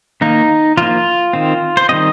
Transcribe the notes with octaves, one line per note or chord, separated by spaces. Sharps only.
D#3 A#3 D#4
F3 A#3 F4
D#3 C4
C5
D#3 G3 C4 D#5